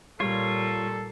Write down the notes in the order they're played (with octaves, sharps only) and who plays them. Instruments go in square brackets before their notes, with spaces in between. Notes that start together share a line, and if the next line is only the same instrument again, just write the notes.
[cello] A#2 [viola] G3 [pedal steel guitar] F4 C#5 [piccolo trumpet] A4